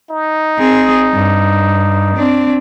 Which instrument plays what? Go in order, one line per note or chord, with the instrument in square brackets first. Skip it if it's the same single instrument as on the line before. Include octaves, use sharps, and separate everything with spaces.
[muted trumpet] D#4
[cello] C4 G#4
G2
C4 D4